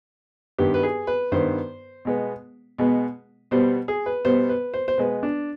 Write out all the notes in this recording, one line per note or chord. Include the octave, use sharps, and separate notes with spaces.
G2 D#3 B3 G4
B4
G#4
B4
G2 D#3 B3 C5
B2 G#3 B3
B2 G#3 B3
B2 G3 B3 C5
G#4
B4
B2 G3 B3 C5
B4
C5
C5
B2 G#3 B3 B4
D4